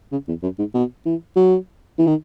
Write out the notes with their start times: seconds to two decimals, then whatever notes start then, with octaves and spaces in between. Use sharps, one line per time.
0.12 C#3
0.28 E2
0.43 F#2
0.59 G#2
0.74 B2
1.05 E3
1.36 F#3
1.98 E3
2.07 D#3